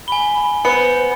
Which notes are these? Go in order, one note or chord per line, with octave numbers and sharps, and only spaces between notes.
G#5 B5 G7
B3 C5 C#7